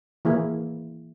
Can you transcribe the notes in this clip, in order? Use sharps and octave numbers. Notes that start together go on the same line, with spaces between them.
E3 A#3 E4 G#4